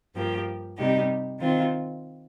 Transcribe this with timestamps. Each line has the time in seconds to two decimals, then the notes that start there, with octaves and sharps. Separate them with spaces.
0.15 G2 F3 A#3 G4
0.77 C3 G3 D#4 G4
1.39 D#3 C4 F4